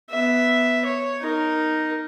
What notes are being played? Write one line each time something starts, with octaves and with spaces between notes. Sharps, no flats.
B3 E5
C#5
D#4 A#4